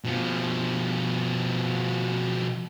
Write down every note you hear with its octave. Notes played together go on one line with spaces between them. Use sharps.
B2 F3